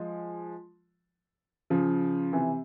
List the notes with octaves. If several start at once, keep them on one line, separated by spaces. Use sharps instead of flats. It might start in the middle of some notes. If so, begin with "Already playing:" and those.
Already playing: F3 G#3
C#3 F3
C3 E3